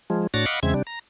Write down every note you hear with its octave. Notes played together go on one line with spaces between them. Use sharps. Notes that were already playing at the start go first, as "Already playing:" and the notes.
F3 G#3
A2 D4 F#4 C#5 A6 A#6
D#5 F5 F#5 B5 C#6 D6
E2 C#3 G#3 C4 E5 G#6
C3 G3 D4
A#5